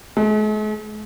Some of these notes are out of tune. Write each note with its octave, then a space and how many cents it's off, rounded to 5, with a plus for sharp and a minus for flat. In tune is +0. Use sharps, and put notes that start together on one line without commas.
G#3 +45